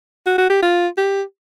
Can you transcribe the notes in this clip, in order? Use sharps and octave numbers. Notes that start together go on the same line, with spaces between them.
F#4
F#4
G4
F4
G4